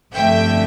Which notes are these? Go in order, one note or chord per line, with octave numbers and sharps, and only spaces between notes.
G1 F2 D3 A3 E5 G5